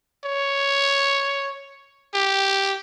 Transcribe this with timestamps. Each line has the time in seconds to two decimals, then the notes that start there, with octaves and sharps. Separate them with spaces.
0.24 C#5
2.14 G4